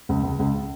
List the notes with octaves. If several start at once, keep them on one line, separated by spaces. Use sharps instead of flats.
C#2
C#2
C#2